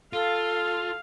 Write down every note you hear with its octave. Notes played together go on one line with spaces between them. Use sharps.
F4 A4 F5